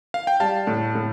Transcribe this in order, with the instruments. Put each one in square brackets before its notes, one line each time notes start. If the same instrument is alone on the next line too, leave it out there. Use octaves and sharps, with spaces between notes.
[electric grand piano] F5
G5
[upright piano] G3 [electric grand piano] F5 A5
[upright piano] A2
A2